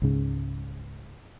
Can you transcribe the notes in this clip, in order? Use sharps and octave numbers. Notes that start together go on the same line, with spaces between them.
C#2 G#2 C#3